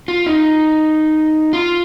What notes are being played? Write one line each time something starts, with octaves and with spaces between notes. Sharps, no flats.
F4
D#4
F4